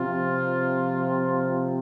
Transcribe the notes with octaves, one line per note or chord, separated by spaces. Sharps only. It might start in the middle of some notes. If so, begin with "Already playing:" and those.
Already playing: C3 F3 F4